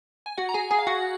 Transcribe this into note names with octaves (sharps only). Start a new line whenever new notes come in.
G#5
F#4 F#5
A#5
G#4 G#5
G#4 G#5
F5
F#4 F#5